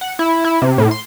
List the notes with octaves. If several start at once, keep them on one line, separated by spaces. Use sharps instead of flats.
F#5
E4
E4
C3
A2
C6